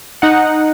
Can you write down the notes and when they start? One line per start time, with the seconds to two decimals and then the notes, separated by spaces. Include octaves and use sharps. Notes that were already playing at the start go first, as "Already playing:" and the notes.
0.22 D#4 F#5